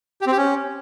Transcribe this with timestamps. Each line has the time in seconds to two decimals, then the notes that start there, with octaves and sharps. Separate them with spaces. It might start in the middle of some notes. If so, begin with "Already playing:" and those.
0.21 G4
0.27 C4
0.32 G4
0.37 C#4